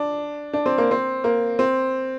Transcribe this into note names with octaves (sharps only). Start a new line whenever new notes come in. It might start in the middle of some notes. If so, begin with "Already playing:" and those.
Already playing: D4
D4
C4
A#3
C4
A#3
C4